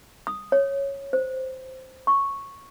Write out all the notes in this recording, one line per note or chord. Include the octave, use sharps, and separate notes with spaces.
D#6
C#5
C5
C#6